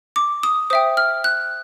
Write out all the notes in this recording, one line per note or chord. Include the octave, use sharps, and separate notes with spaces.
D6
D#6
C5 E5 G5 D#6
F6
F#6